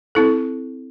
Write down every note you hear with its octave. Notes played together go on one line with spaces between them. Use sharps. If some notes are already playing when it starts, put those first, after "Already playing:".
C4 E4 A4